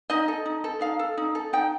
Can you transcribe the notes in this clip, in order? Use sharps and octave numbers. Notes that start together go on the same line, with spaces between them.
D#4 D#5
A4
D#4
A4
D#4 F5
A4
D#4
A4
D#4 G5